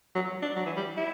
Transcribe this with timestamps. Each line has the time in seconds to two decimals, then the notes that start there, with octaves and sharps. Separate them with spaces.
0.15 F#3
0.42 D4
0.56 F#3
0.66 E3
0.77 G3
0.97 E4